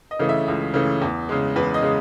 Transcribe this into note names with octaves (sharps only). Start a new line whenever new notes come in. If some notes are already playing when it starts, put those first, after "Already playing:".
D#5
C#3 E3 A3
E5
C#2
C#3 E3 A3
E2
C#3 G#3
E2 B4
D#5
C#3 G#3